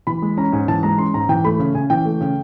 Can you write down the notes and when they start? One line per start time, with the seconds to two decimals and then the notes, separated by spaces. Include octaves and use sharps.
0.07 E3 B5
0.22 G#3
0.37 C#4 A#5
0.53 G#2 G#5
0.68 E3 A5
0.83 G#3 A#5
0.98 C#4 C6
1.14 G#2 A#5
1.29 E3 G5
1.45 A3 B5
1.59 C#3
1.75 C#3 G#5
1.90 E3 G5
2.05 A3
2.21 C#3